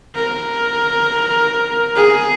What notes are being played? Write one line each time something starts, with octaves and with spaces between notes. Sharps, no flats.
A#4
G#4